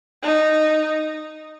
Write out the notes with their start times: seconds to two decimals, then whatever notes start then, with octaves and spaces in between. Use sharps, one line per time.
0.23 D#4